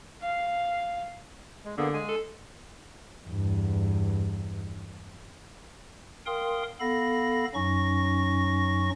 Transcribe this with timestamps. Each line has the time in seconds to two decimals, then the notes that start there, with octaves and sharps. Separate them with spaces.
0.22 F5
1.65 G#3
1.78 D3 A#3 B3 G#4
1.94 G#3 G#4 G#5
2.09 A4
3.27 E2 G2
6.26 A#4 F5 G5 C6 D#6
6.80 B3 A4 F5 B5 A#6
7.54 F#2 F#3 C#4 D#4 C#6 A#6